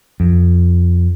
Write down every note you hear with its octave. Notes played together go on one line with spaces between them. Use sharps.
F2